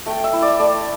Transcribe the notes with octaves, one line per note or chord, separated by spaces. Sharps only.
A3 G5
E5
E4
D5
A3 D5